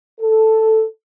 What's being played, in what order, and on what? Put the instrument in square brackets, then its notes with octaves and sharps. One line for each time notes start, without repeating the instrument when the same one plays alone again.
[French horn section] A4